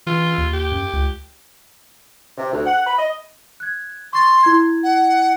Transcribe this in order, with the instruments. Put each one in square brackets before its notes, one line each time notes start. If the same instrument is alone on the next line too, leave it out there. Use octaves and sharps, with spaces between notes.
[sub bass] E3 [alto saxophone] F4
[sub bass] D#2
[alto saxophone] G4
[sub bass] F#2
C#2
[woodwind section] C3
D2
F#5
B5
D#5
[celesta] F#6 G#6
[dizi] C6 [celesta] C#6 A6
[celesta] E4 G#6
[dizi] F#5